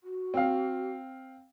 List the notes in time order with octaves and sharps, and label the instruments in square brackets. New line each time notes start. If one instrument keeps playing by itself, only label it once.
[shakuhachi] F#4
[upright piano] C4 F5